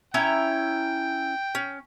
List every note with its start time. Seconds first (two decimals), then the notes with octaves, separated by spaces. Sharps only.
0.14 C#4 E4 G5 A#5
1.55 C#4